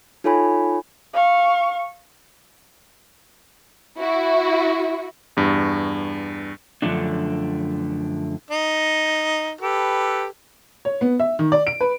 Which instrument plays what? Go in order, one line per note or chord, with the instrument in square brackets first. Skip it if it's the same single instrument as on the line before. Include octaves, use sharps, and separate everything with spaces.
[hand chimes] D#4 F4 A4 C#5 G#5 B5
[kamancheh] F5 C#6
[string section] E4 F#4
[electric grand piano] E2 G2
[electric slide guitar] F#2 B2 D3 F3 A3 D4
[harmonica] D#4
G4 A4 B4
[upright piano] C#5
B3
E5
D#3
D5
D7
B4